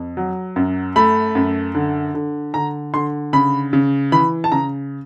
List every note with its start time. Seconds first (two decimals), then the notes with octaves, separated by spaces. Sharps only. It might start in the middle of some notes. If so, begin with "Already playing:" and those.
Already playing: F2
0.17 F#3
0.56 F#2
0.96 A3 B5
1.35 F#2
1.75 D3
2.14 D3
2.54 D3 A#5
2.94 D3 C6
3.33 C#3 B5
3.73 C#3
4.12 E3 B5
4.44 A5
4.52 C#3 A#5